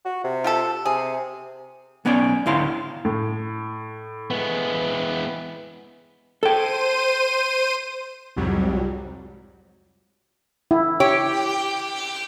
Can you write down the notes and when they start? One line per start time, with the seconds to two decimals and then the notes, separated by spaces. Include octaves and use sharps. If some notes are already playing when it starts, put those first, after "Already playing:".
0.05 F#4
0.24 C3
0.44 F4 G4 A4
0.85 C3 G#4
2.05 B1 B3 C#4 C#5 D5
2.46 D2 G#2 E4 C#5 F5 C6
3.05 A2
4.31 E3 G#3 B3
6.43 A4 C5 G5 D#7
8.36 C2 F2 G#2 F#3 G3
10.71 E4
11.00 G4 C#5